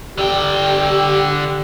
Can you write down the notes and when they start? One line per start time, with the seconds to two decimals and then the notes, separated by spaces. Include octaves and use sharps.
0.18 D3 G4 G5